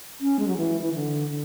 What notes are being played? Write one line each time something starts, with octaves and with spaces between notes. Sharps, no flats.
C#4
G#3
F#3
E3
E3
D3
D3